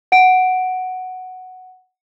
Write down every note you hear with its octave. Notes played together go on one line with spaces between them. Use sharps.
F#5 D7